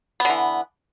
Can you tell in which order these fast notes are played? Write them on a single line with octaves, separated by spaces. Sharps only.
B3 D3 E3